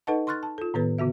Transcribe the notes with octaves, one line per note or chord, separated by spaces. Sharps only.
D#4 A4 B4 D#5 F#5 A5
C6 C#6 F6 F#6 A6
A5
F4 A4
A2 D#3 B3 A4 B4
C#3 B3 F#4 E5